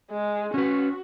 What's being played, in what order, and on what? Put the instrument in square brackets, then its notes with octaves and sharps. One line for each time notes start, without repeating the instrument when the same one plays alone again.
[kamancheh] G#3
[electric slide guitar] C#4 B4 [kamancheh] F#4